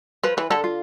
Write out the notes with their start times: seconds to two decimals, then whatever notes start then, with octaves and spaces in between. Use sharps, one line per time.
0.23 F3 B4
0.37 E3 B4
0.50 D3 A4
0.64 F4